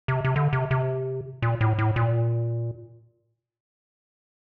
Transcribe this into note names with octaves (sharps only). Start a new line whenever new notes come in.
C3
C3
D3
C3
C3
A#2
A2
A2
A#2